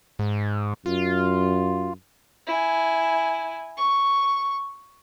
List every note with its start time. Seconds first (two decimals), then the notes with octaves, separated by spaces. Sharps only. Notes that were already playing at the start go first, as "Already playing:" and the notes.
0.19 G#2
0.86 F#2 F4
2.47 E4 G#5
3.77 C#6